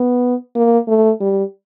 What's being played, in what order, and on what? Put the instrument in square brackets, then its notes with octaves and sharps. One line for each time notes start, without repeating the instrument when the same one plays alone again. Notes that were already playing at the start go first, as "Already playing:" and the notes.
Already playing: [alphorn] B3
A#3
A3
G3